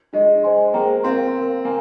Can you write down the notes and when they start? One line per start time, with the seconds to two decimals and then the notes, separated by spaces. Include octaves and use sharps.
0.13 G#3 D4 G#4 D#5
0.43 C5 D#5 G#5 C6
0.74 A#3 G#4 C5 G5 A#5
1.04 C4 A#4 F5 C6
1.35 A#4 F5 C6
1.65 A#3 A#4 F5 G#5